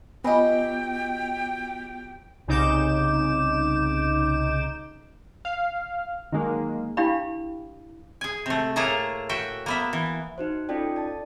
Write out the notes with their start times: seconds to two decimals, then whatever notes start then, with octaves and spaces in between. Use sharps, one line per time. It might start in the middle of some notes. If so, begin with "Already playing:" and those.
0.24 F#3 B3 F4 G4 D#5 G5 G#5 B5
2.47 C2 C#3 D#4 D6 G6 E7
5.45 F5
6.32 D#3 F#3 G#3 A#3
6.97 D4 E4 G4 F5 G5 B5
8.21 G#4 G#5
8.46 C3 A3
8.76 A2 A3 A#3 G#4 A5 A#5
9.29 F#4 E5 G5
9.66 A#3 B3 E5
9.93 E3
10.38 D#4 F#4 C5
10.69 C#4 D#4 F4 A4 D5 G5
10.96 D5 A5